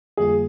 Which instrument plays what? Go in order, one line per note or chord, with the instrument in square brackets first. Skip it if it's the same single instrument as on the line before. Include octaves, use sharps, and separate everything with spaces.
[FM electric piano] F2 D3 G3 A#3 F4 [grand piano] G#4